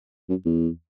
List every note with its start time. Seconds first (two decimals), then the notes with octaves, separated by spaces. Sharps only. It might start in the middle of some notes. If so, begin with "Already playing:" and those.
0.30 F#2
0.45 E2